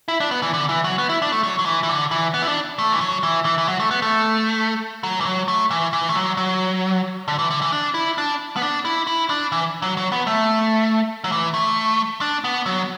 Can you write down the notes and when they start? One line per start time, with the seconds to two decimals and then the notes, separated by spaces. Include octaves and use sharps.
0.08 E4
0.20 D4
0.31 B3
0.42 E3
0.54 D3
0.69 E3
0.84 F#3
0.98 B3
1.09 E4
1.22 D4
1.32 A3
1.43 F#3
1.59 F#3
1.65 E3
1.83 E3
1.89 D3
2.11 E3
2.34 B3
2.42 E4
2.48 D4
2.79 A3
2.92 E3
3.01 F#3
3.23 E3
3.45 E3
3.58 E3
3.68 F#3
3.80 A3
3.91 B3
4.02 A3
5.03 F#3
5.20 E3
5.25 F#3
5.48 A3
5.71 E3
5.93 E3
6.09 A3
6.15 F#3
6.37 F#3
7.28 D3
7.39 E3
7.51 D3
7.62 E3
7.72 D4
7.94 E4
8.18 D4
8.56 B3
8.62 D4
8.85 E4
9.07 E4
9.30 D4
9.52 E3
9.82 F#3
9.97 F#3
10.12 B3
10.27 A3
11.24 F#3
11.32 E3
11.54 A3
12.21 D4
12.44 B3
12.66 F#3